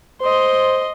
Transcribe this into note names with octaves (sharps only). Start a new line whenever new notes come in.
C5 D#5 C6